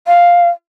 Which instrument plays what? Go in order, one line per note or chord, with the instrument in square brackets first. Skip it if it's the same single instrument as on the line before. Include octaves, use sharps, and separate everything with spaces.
[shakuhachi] F5